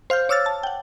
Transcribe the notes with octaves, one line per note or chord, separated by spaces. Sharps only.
C5 F5 F6 G6
C#5 D6 E6 F6 A6
A5
F#5 G5